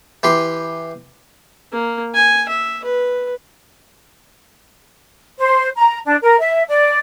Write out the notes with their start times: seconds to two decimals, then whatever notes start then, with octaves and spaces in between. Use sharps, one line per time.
0.23 E3 G4 C6
1.73 A#3
2.14 G#5
2.49 E5
2.84 B4
5.39 C5
5.76 A#5
6.05 D4
6.22 A#4
6.40 E5
6.69 D5